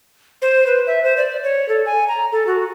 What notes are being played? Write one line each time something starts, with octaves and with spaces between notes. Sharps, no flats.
C5
B4
E5
C5
D5
C#5
A4
G#5
A#5
A4
F#4